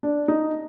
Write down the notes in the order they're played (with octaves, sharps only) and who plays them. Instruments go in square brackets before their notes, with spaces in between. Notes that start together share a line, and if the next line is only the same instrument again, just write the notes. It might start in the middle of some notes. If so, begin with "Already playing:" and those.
[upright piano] D4
D#4